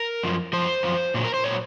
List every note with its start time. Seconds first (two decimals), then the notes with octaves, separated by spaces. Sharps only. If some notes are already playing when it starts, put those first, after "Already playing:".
Already playing: A#4
0.23 F#2 F3
0.53 F#2 F3 C5
0.83 F#2 F3
1.14 A#2 F#3
1.25 A#4
1.34 C5
1.44 A#2 F#3 C#5